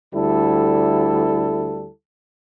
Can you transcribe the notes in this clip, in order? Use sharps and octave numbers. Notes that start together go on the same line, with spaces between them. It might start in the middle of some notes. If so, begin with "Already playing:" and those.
D2 G3 E4 A4